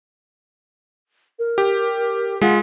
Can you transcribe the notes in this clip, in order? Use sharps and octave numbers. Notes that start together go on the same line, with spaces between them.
A#4
G4
G#3 F4 F#5